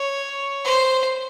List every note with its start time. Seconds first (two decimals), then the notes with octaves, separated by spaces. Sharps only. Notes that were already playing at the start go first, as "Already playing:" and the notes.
Already playing: C#5
0.65 C5